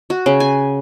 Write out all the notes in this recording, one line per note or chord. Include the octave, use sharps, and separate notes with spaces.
F#4
C#3
G#5